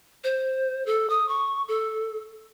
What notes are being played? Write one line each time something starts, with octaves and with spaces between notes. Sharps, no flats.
C5
A4
D#6
C#6
A4